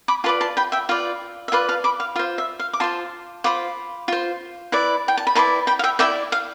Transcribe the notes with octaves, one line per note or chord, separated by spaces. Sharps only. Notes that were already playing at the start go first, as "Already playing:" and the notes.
B5 D6
F4 B4 D5 A5 C6
A5 C6
G5 B5
E5 G5
F4 B4 D5 F5
E5
F4 B4 D5 F5
F5 A5
B5 D6
F5
F4 C5 F5
E5
F5
D6
F4 C5 A5 C6
F4 C5 B5 D6
F4 C5
E4 B4 D5
G5
A5
B5
E4 B4 D5 A5 C6
G5 B5
F5
E5 G5
E4 B4 D5 E5 G5
F5